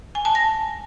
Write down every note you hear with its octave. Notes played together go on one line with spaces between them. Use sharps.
G#5
A5
A#6